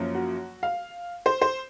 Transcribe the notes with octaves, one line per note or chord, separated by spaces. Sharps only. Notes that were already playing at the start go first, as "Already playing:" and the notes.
Already playing: F#2 F3 A#3 C#4
F#4
F5
C5
C5